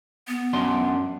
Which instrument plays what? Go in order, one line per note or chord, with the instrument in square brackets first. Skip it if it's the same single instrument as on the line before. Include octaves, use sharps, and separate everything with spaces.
[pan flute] B3
[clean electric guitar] F#2 D4 C6